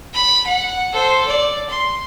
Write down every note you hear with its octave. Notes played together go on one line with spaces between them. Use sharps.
B5
F#5
A4 C5
D5
C6